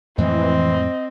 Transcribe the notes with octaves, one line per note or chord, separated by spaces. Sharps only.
F2 A2 E3 G#3 C4 D#5